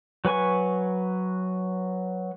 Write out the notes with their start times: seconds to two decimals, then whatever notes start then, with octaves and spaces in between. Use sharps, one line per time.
0.25 F#3 B4 G#5 C#6